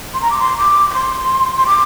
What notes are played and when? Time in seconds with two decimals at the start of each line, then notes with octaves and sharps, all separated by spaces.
0.14 C6
0.22 A#5
0.31 D6
0.39 C6
0.58 D6
0.90 D6
0.94 C6
1.57 C6
1.67 D6